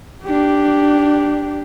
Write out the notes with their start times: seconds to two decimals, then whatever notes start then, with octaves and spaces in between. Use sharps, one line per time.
0.25 D4 G4